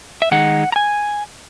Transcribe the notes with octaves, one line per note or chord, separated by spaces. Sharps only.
E5
D#3 G#3 D#4 F#5
A#5
G#5